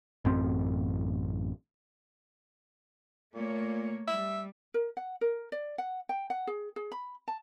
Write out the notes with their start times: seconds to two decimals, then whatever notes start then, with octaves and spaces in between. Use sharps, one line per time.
0.25 A1 F#2 C4
3.35 A#2 A3 A#3 C#5
4.08 G3 E5
4.74 A#4
4.97 F#5
5.21 A#4
5.52 D5
5.78 F#5
6.09 G5
6.30 F#5
6.47 G#4
6.76 G#4
6.92 B5
7.28 A5